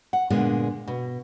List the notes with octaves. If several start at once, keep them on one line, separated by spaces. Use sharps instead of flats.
F#5
A#2 D3 G#3 B3
B2